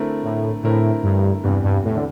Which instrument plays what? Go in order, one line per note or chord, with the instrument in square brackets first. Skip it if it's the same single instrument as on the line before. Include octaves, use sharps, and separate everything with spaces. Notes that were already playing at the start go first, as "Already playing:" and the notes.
Already playing: [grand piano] D3 A3 C4 E4 A#4
[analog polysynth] A2
[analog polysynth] A2 [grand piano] D3 A3 C4 E4 A#4
[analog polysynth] G2
[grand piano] E2 C3 E3 G3 [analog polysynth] G2
[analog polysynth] G2
A2
D3